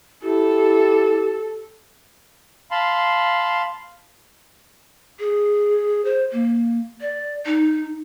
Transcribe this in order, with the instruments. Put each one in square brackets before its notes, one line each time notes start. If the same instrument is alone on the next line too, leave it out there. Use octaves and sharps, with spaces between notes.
[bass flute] E4 [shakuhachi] G4 [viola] A4
[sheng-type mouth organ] F5 A5 B5 C6
[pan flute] G#4
C5
A#3
D5
D#4